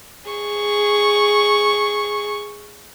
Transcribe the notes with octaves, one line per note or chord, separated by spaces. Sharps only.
G#4 C#6